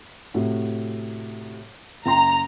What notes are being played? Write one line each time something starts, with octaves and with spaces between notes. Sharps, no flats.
A2 C3 F#4
F#1 G5 A#5 C6